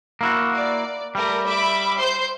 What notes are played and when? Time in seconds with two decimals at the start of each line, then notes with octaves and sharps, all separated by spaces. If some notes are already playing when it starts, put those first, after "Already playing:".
0.21 A#3 E4 F#4
0.54 D5
1.15 G3 A3 A#4
1.46 E5 B5 D6
1.98 C5 C6 G6